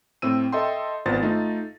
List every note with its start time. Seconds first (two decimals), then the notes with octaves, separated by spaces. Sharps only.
0.22 A2 C4 E6 D#7
0.52 A4 D#5 E5 G5 C6
1.06 G#1 B3 F4 C5 A6
1.22 A3 D#4 F4